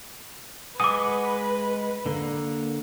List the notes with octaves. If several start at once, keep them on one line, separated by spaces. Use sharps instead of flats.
G#3 B4 F#5 G#5 D6 D#6
D3 A#3